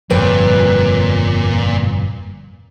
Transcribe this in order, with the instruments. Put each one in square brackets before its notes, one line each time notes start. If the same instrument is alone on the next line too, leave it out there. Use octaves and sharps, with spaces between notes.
[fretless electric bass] G1 F2 G3 [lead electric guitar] A#2 [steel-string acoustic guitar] B4 C#5 G5